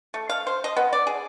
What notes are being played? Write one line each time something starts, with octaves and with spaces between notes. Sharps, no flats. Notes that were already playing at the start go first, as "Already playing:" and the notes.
A3
F5
C5
D#5
B3
D5
G#4